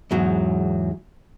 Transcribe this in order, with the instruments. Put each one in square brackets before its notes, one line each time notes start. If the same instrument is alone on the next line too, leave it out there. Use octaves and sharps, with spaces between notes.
[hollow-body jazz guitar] E2 G#2 F#3